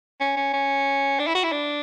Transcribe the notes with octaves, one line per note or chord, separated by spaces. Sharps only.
C#4
C#4
C#4
D4
E4
F#4
E4
D4